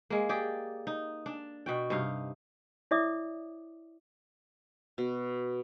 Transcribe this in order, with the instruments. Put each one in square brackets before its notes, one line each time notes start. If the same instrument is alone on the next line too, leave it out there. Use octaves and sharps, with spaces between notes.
[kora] G#3 A#3
G4 G#4 D5
D#4
D4
B2 F#4 G5
G2 C3 D#4 F5
[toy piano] E4 C#5 D5 E5 D6 D#6
[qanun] B2